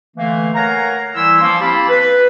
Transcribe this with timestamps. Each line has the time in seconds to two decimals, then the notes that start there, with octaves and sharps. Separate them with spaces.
0.17 D3 E3 A3 A#3
0.55 A#4 C#5 F5 F#5 G#5 A#5
1.15 E3 G3 E4 C6 E6
1.41 F3 A#3 C#4 C6
1.61 C4 E4 G4 F5 A5 B5
1.89 B4